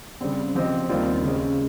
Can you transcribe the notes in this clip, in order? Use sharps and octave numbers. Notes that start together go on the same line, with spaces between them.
C#3 G3 C4
F3 C4 G4 C5 D#5
D#2 C#3 G3 C4 F4
C#3 G#3 C#4